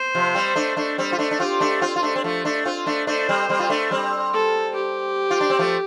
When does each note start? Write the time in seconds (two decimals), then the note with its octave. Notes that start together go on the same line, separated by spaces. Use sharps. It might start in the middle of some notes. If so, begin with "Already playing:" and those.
Already playing: C5
0.15 C3 F3
0.35 G3 C4
0.56 A3 D4
0.76 A3 D4
0.98 G3 C4
1.13 F4
1.19 A3 D4
1.31 D4
1.40 C4 F4 G4
1.60 A3 D4
1.82 C4 F4
1.96 F4
2.03 A3 D4
2.16 C4
2.24 F3 A3
2.45 A3 D4
2.65 C4 F4
2.86 A3 D4
3.07 A3 D4 C5
3.29 G3 C4
3.49 G3 C4
3.60 F4
3.70 A3 D4
3.91 G3 C4
4.33 A4
4.75 G4
5.31 F4
5.41 D4
5.50 C4
5.59 F3 A3